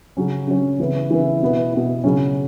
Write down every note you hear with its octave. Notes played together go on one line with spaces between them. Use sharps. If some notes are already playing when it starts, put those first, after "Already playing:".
C#3 F#3 C#4
C#3 F#3 C#4
C#3 E3 B3 E4
C#3 E3 B3 E4
B2 B3 E4
B2 B3 E4
C#3 F#3 C#4